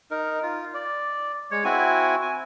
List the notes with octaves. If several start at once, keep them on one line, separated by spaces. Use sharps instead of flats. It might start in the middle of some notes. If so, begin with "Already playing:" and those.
D#4 A#4
F4
D5
G#3 C#5
C4 E4 F#4 G#5
G#5